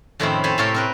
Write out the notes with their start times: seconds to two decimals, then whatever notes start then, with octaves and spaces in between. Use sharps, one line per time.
0.20 F2 A2 D#3 C4 C#4 E4
0.44 C5 C#5 E5 G#5 A5 B5
0.58 A2 C3 A4 A#4 C#5 G5
0.74 C4 A#4 B4